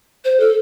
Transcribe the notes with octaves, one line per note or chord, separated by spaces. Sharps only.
C5
A4